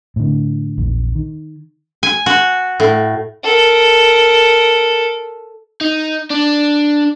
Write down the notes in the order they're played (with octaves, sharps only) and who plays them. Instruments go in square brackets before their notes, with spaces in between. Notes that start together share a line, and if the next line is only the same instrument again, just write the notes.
[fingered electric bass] A2 D3
A#1 E2
D#3
[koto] G#5
F#4
A2
[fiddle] A4 A#4
[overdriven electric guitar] D#4
D4